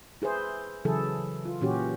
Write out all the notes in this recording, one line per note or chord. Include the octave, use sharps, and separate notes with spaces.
E4 G#4 B4 C5
C#3 E3 F#3 E4 G#4 A4
F4
A#2 E3 C#4 F#4 G4